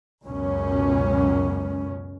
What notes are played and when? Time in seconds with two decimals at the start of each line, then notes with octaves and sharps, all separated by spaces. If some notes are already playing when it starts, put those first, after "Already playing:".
0.25 C#2 F#2 B2 C#4